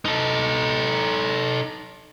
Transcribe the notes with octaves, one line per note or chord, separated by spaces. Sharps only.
D#4 A4